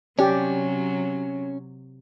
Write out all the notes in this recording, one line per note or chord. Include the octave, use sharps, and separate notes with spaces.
C3 F#3 C#4 G4 D5